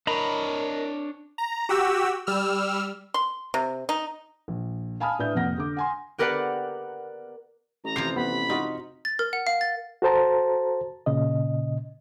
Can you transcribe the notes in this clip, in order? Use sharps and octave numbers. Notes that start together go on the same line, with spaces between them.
D4 A#4 C#5 D#5 A#5 B5
A#5
F#4 G4 E6
G3 E6 F6
C6
C3
D#4
A#1
F5 G#5 A5 B5 D#6 F6
A2 D4 B4 E5 G6
F1 F2 A#3 F#5 A#6
D3 D6
F#5 G#5 C6
B3 G4 A#4 B4 D5 F#5
A1 A#5
C3 E3 F3 C7
B3 B5
D#4 F4 F#4
A6
A#4
F#5
F5
A6
F#4 A4 C5 A5 A#5
A#2 C#3 D#5